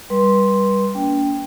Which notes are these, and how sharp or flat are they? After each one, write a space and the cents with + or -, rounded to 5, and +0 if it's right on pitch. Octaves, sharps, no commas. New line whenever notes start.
G3 +0 B4 -30 C6 +0
A#3 +0 D4 -45 G5 +0